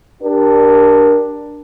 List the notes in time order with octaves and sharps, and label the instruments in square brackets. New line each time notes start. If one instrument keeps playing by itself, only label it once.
[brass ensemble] D4 G4 A#4